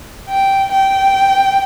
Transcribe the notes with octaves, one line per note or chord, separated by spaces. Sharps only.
G5
G5